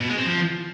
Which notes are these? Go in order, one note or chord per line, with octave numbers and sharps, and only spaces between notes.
B2
G#3
C4
F3